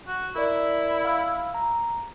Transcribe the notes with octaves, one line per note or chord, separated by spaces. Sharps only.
F#4
E4 A#4 D5
F5 B5 E6
A#5